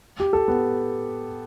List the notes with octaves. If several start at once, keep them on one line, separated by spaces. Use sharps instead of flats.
G4
A4
B3